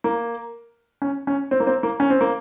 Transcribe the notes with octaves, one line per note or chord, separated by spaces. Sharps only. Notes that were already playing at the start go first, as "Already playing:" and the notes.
A#3
C#4
C#4
C4
A#3
C4
A#3
C#4
C4
A#3